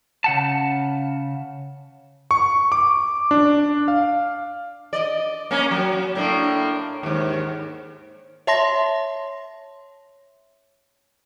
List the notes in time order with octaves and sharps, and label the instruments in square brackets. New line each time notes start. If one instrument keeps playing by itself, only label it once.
[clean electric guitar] C#3 F#5 A5
[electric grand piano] C#6
D6
D4
F5
[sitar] D5 D#5
A#3 C#4
F#3
A2 A#3 D4
D#2 G#2
[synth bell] C#5 E5 A5 C6 A#6